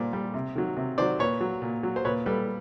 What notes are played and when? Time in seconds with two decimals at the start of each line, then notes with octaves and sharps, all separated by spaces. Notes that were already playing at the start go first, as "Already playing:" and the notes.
Already playing: A#2 G3 C5 D5
0.13 G3
0.34 C3
0.56 D#3 F#3
0.77 C3
0.98 D#3 C5 D5
1.01 F#3
1.19 A#2 B4 C#5
1.41 F#3
1.62 A#2
1.83 F#3
1.96 C5
2.05 A#2 B4 C#5
2.26 G3 A4 B4